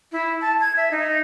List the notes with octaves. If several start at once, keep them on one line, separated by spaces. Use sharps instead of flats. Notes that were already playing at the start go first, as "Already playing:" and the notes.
E4
A5
G#6
E5
D#4